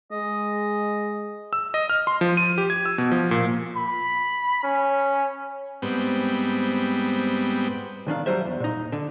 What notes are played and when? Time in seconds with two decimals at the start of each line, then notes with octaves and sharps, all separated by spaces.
0.12 G#3 D#5
1.53 E6
1.74 D#5
1.90 F6
2.07 C6
2.21 F3
2.37 D#7
2.58 G4
2.70 G#6
2.86 E6
2.98 B2
3.11 F3
3.31 A#2
3.77 B5
4.63 C#4
5.82 G#2 G3 B3 C4
8.07 B1 D#3 D4 F5
8.26 F#3 G3 C5 E5
8.45 E2
8.60 A#2 D#4
8.92 D3